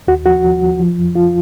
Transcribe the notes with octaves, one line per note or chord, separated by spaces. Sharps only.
D#2 F#4
F3 F#4
F3
F3
F3
F2
F3 F4